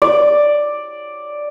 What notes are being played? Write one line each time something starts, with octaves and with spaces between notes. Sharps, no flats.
D5